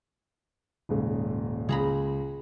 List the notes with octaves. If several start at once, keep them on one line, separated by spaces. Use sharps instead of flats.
D#1 G#2 C#3
C#2 G#4 A#5 B5